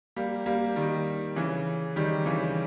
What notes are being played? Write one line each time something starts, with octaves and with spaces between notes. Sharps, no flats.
G3 A#3
G3 A#3
D#3 G3
C#3 E3
D#3 G3
C#3 E3